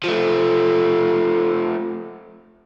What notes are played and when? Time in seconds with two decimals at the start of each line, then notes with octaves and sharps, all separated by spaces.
0.04 F3 A3